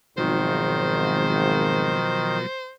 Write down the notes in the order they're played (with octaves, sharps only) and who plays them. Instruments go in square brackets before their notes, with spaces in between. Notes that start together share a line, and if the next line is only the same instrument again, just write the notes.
[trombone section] G#1 [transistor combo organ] B2 F3 F#3 [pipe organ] D#3 [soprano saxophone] C5